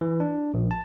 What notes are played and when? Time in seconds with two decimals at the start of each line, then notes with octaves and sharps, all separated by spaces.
0.01 E3
0.20 D4
0.54 A#1
0.71 A5